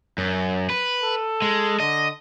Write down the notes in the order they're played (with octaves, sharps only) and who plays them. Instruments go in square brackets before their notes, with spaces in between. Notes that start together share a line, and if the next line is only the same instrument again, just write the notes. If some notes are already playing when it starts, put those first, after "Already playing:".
[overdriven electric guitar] F#2
B4
[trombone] A4
[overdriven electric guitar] G#3
[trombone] D3 [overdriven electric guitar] D#5